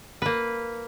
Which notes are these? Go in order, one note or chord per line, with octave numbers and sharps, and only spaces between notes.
A#3 B4